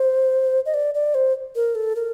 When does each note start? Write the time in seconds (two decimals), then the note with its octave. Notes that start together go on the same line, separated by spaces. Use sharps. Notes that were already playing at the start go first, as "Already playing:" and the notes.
Already playing: C5
0.66 D#5
0.74 D5
0.94 D5
1.14 C5
1.56 A#4
1.75 A4
1.96 A#4